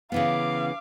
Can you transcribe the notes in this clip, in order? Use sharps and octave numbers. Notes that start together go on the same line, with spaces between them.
C#3 E3 B3 F5 D6